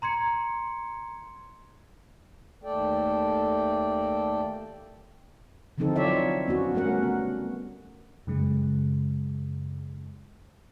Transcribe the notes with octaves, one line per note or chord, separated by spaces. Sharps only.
A#5 C6 G#6 C#7
D#2 A3 A4 D5 G5
D3 E3 F3 C4 D#4 A4
F#3 F4 C#5 D5 E5
B3 C#4 F#4
G3 A3 C#4 A#4 F#5
B3
F#2 C#3 G#3